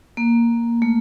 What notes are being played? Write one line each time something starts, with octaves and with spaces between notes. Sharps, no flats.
A#3
A3